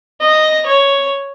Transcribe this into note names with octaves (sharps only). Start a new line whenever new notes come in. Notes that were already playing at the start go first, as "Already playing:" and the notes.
D#5
C#5